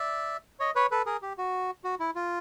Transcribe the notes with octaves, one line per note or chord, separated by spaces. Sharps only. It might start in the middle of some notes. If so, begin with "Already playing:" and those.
Already playing: D5 E5
C#5 D#5
B4 C#5
A4 B4
G#4 A#4
G4
F#4
F#4
E4
F4